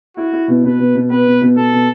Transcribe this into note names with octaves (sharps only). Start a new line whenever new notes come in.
E4 F#4
E4
B2
B2 B4
B2
B2
B3 B4
B2
B2
B2 A4
B2